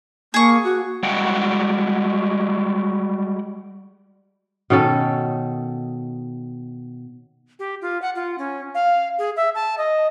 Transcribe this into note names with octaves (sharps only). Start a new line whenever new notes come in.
A#3 G#4 C#6
F#4
G3 G#3 F#4 F#5 G5
B2 D#3 C#4 A4
G4
F4
F#5
F4
C#4
F5
G#4
E5
A5
D#5